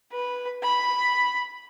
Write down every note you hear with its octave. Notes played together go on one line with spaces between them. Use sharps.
B4
B5